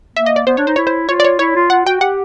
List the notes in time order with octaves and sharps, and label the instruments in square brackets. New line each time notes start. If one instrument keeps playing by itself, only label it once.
[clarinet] A#3 [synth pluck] E5
[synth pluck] D#5
D5
[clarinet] B3 [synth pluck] C5
[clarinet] D4 [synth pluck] C#5
[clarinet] D#4 [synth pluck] C5
[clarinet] E4 [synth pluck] C#5
[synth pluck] C5
[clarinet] F4 [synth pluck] C#5
[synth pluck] D5
C#5
[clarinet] E4 [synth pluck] C#5
[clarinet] F4
[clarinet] F4 [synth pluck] F#5
[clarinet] F#4 [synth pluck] G5
[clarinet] G4 [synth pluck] F#5